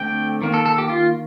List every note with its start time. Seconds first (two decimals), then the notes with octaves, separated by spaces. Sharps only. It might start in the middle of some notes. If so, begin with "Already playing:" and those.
Already playing: D3 A3 C4 G5
0.42 D#3 A#3
0.54 A4
0.66 A4
0.78 G4
0.89 F4